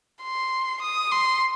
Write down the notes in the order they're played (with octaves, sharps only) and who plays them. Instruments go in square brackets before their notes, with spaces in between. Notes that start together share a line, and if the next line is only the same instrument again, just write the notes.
[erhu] C6
D#6
C6